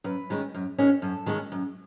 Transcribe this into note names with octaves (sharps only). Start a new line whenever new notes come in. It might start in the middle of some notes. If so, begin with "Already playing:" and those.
F#2 B4
D#3 G#3 C#4
F#2
D#3 G#3 C#4
F#2 A4
D#3 G#3 C#4
F#2